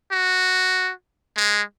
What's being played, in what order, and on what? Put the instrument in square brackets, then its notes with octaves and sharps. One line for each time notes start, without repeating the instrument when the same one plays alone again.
[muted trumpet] F#4
G#3